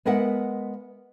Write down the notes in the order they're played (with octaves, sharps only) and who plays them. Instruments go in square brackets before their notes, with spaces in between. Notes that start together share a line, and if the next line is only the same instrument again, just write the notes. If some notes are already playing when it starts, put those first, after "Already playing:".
[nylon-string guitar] G#3 B3 A#4 E5 F#5